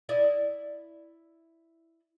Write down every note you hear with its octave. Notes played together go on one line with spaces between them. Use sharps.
E4 D5 D#5